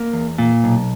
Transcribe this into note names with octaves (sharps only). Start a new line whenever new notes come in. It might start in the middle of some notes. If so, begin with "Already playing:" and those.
Already playing: A#3
E2
A#2
B1